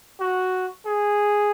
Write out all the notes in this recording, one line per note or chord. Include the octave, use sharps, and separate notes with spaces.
F#4
G#4